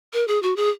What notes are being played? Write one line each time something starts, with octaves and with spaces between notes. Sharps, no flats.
A#4
G#4
F#4
G#4